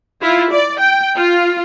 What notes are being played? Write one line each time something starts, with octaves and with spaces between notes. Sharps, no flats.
E4 F4
D5
G5
F4